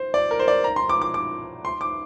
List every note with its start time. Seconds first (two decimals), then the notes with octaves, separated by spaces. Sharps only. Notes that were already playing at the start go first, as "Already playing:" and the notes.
Already playing: C5
0.14 D5
0.31 A#4
0.39 C5
0.48 D5
0.64 A#5
0.76 C6
0.89 D6
1.02 D6
1.14 D6
1.65 C6
1.81 D6